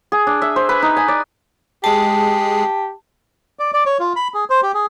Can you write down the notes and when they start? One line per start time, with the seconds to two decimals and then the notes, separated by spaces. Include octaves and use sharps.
0.12 G#4
0.27 D4
0.42 E5
0.56 C5
0.69 B4
0.82 D#4
0.97 G#5
1.08 D5
1.84 G#3 G4 G#4 A5 C7
3.59 D5
3.74 D5
3.86 C#5
4.00 F4
4.16 B5
4.34 G#4
4.50 C5
4.63 G4
4.74 G#4